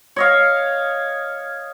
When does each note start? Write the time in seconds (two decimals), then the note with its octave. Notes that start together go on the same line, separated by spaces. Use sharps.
0.16 C#5 D#5 F5